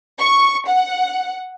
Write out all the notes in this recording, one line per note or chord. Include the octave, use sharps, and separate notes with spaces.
C#6
F#5